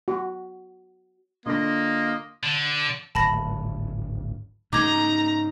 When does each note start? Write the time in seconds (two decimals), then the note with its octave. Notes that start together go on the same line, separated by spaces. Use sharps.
0.08 F#4
1.46 D3 A#3 F4 D#5 A#6
2.43 D3
3.15 D1 G#1 A5 B5 A#6
4.73 G#2 C#3 D#4 A#5 D6 G#6